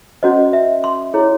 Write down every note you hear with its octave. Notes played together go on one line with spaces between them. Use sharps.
C#4 F#4 C5 D#5
E5
C6
E4 G#4 C#5